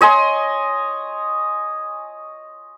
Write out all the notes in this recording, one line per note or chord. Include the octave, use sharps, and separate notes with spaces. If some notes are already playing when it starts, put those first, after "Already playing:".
C#5 D#5 G#5 C6